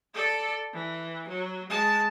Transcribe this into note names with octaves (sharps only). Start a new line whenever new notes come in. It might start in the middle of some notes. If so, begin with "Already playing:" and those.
A4 D5
E3
F#3
G#3 A5